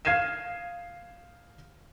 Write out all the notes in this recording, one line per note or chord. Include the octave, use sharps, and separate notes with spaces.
F5 F6 G#6 C7 D#7 E7